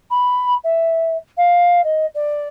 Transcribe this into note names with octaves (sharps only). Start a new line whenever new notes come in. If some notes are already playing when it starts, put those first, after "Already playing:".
B5
E5
F5
D#5
D5